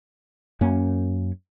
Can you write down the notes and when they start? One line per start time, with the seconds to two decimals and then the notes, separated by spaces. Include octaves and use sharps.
0.61 F#2 A#3 C#4